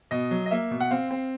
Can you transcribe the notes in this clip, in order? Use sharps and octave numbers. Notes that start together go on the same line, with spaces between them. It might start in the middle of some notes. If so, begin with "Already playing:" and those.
B2 D#5
F#3
D#5
A#3 E5
B2
F#5
C4 F5
C4